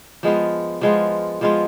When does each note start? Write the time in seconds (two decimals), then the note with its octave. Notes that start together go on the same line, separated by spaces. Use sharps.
0.23 F3 G#3 B3 F4
0.81 F3 G#3 B3 F4
1.41 F3 G#3 B3 F4